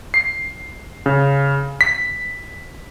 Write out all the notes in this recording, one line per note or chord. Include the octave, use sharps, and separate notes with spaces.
C7
C#3
B6